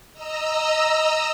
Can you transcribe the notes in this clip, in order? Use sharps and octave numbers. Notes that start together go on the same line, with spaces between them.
D#5 A#5 E6